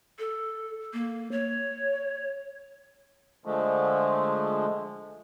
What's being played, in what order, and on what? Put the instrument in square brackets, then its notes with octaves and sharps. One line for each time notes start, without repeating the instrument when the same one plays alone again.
[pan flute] A4
A#3
C#5
[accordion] D3 F3 G#3 A3